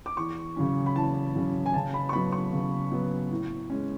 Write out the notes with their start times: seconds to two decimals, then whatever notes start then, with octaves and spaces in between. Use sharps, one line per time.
0.06 D6
0.17 E2 C#6
0.56 C#3 F#3 C#4
0.86 B5
0.96 E2 A5
1.35 C#3 F#3 C#4
1.66 G#5
1.74 C#3 A5
1.94 B5
2.09 C#6
2.13 F#3 B3 B5
2.32 C#6
2.52 C#3
2.92 F#3 B3
3.31 A2
3.70 G#3 C#4